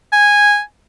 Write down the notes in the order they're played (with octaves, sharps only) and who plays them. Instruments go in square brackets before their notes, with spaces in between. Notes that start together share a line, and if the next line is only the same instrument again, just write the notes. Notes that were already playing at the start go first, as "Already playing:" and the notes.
[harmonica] G#5